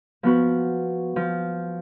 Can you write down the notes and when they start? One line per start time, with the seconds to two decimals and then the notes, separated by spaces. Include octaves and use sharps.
0.23 F3 B3 F#4
1.16 F3